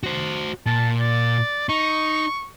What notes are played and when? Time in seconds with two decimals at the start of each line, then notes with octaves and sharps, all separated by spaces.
0.03 F#4 C5
0.66 A#2 A5
1.00 D5
1.69 D#4 C#6